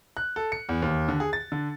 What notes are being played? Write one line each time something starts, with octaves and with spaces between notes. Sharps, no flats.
F#6
A4
C#7
E2
D#2
D3
G#4
A6
D3